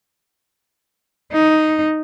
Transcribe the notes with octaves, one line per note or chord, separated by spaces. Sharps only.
D#4